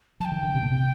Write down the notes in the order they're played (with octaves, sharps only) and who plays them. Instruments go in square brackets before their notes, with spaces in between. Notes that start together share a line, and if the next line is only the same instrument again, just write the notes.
[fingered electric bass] F3 [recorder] A5
[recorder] G5
[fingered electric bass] D#3
D3
C3
A#2
C3